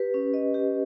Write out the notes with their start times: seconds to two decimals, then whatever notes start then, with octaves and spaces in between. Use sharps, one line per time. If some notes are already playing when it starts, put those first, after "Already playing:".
Already playing: G4 B4
0.14 C#4
0.34 D#5
0.54 G4